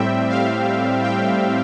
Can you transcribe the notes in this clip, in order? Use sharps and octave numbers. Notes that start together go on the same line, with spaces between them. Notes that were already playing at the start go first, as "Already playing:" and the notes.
Already playing: A2 G3 C4 E5 G5
F5
G5